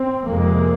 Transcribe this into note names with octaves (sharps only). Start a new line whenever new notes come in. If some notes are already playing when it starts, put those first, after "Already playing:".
Already playing: C4
F2 C3 G#3 A#3